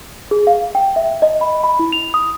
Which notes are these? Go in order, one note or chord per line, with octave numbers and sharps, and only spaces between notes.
G#4
F5
G5
E5
D#5
B5
B5
E4
F7
D#6